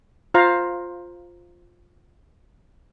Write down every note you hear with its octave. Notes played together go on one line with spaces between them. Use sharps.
F4 C5 F5 A#5